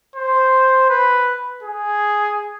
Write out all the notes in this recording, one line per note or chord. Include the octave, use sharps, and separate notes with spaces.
C5
B4
G#4